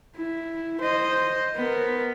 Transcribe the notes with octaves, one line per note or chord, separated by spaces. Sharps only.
E4
C5 D#5
B3 A#4